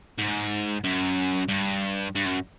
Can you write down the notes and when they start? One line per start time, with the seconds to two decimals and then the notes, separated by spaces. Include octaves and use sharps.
0.18 G#2
0.84 F#2
1.49 G2
2.15 G2
2.25 F#2